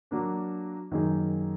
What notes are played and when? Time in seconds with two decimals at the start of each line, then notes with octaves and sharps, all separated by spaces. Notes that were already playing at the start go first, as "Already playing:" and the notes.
0.11 F#3 A#3 D4
0.91 F#2 D#3 A#3 D#4 G#4